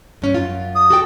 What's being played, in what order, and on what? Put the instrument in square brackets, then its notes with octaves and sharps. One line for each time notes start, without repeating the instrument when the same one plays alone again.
[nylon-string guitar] G2 C#4
F#2 F4
[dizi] D#6
[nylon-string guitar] F#4 A4 G5